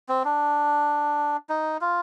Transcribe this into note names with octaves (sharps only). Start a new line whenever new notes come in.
C4
D4
D#4
F4